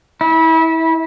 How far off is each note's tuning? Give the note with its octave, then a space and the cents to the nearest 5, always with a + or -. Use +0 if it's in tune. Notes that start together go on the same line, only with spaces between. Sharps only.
E4 -30